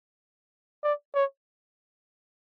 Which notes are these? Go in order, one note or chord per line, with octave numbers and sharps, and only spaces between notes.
D5
C#5